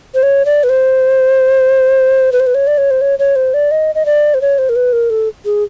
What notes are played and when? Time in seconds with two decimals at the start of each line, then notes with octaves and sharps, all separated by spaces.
0.15 C5
0.23 C#5
0.46 D5
0.64 B4
0.69 C5
2.32 B4
2.40 C5
2.47 B4
2.55 C#5
2.67 D5
2.78 C#5
2.91 C5
3.01 C#5
3.19 C#5
3.36 C5
3.54 D5
3.71 D#5
3.95 D#5
4.06 D5
4.34 C5
4.41 C#5
4.58 C5
4.69 A#4
4.76 B4
4.93 A#4
5.10 A4
5.45 G#4